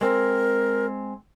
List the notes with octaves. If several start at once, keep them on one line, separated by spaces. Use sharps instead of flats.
G#3 C4 A#4